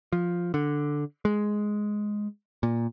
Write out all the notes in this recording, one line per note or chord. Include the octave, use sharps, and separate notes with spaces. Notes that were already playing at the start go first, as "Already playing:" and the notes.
F3
D3
G#3
A#2